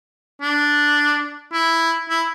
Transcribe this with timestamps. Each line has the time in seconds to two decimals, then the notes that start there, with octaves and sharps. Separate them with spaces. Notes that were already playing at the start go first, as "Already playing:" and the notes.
0.41 D4
1.52 E4
2.09 E4